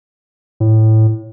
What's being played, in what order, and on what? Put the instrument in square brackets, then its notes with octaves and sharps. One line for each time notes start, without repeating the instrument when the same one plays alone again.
[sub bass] A2